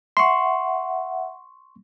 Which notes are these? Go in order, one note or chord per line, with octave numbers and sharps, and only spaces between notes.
E5 F#5 C6 C#6